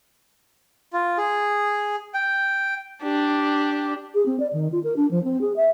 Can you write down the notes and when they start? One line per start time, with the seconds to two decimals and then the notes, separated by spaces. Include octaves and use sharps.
0.93 F4
1.18 G#4
2.14 G5
3.03 D4 G4
4.14 G#4
4.26 C4
4.40 D5
4.53 D#3
4.72 F4
4.84 A#4
4.96 D4
5.11 F3
5.24 C4
5.41 G#4
5.56 E5